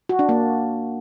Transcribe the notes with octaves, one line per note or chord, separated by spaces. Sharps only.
F#4
D4
A#3